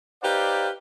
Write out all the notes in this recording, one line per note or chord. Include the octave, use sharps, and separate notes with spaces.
D#4 G4 B4 C5 D5 F5